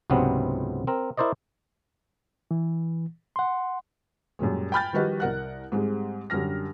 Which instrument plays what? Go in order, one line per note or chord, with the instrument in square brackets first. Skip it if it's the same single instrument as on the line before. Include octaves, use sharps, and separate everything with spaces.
[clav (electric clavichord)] C#2 G#2 C3 F#3 B3 C4
C4 A#4
E4 A#4 C5 D5 D#5
[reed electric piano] E3
F#5 C6
[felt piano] F#2 A#2 G3 G#3
G5 G#5 B5 F6 G6 A6
D#3 F3 G3 F#4 B4 D#5
C2 A#4 F#5 F#6
G#2 G3 G#3 C4
F#2 D3 G3 F6 A#6